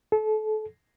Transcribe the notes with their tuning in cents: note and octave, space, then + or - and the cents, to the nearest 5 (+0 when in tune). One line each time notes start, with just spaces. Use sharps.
A4 -30